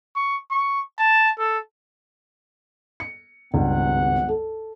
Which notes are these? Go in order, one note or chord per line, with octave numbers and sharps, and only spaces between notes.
C#6
C#6
A5
A4
C#7
G#1 C#2 G2 B3 F#5
A4